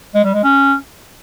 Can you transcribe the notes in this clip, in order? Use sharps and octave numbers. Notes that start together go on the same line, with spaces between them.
G#3
G3
G#3
C#4